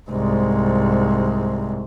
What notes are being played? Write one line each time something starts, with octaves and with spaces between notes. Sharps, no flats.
C2 G#2